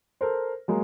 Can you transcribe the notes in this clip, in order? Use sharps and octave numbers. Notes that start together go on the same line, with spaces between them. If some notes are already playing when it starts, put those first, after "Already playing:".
A4 A#4 C5
F#3 G#3 A#3